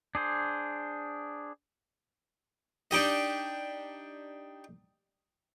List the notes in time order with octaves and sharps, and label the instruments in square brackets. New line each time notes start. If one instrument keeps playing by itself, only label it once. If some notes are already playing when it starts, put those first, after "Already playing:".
[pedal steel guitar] D4 G#4 C5
[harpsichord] D4 D#4 G4 D#5